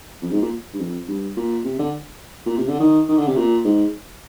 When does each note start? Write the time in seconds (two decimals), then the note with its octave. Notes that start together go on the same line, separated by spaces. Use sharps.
0.22 F2
0.31 G#2
0.42 A#2
0.74 G2
0.80 F2
1.08 G2
1.36 A#2
1.64 C3
1.79 D3
2.46 A#2
2.57 C3
2.68 D3
2.80 D#3
3.08 D#3
3.18 D3
3.27 C3
3.37 A#2
3.64 G#2